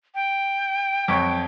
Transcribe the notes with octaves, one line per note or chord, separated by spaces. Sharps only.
G5
F2 F#3 C#6